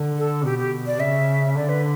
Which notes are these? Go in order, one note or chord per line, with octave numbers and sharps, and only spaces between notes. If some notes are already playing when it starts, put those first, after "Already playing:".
Already playing: D3
A4
B2 G4
G4
D5
C#3 E5
D3 D5
B4